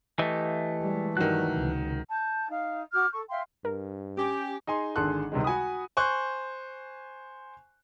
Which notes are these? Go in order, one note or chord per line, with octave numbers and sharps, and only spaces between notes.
E3 A3 G4 D#5
G3 G#3
G2 D#3 F#3 G3 F#6
C#2 C3
A5 G6
D#4 F5
F#4 D6 F6 G6
A4 C#6
E5 F5 G5 C6
G2 A#4
C#4 G4 G#5 D6
D#4 G#4 G#5 C6
G#1 D3 G#4 A4 C6 F#6
C#2 C3 D#3 G3 G#3
F#4 G#5 B5 D#6
C5 G#5 C#6 F#6